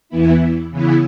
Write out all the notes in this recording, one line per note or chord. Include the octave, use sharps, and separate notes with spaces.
E2 E3 B3 E4
C#3 E3 B3 E4